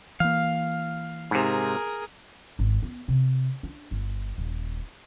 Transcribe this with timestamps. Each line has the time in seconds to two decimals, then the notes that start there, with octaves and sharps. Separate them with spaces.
0.20 E3 A#3 F5
1.31 G#2 C3 G#4 A#4
2.59 G#1
2.83 B3
3.08 C3
3.63 D4
3.91 G1
4.38 D#1